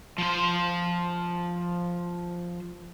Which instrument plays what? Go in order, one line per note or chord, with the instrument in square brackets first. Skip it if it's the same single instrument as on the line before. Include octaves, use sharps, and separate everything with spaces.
[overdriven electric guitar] F3 C5